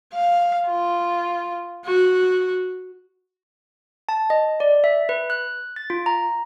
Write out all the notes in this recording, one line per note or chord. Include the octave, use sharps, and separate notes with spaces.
F5
F4
F#4
A5
D#5
D5
E5
B4
F#6
A6
F4
A#5